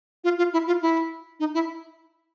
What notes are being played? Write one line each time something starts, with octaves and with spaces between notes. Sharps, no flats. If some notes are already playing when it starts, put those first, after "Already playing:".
F4
F4
E4
F4
E4
D#4
E4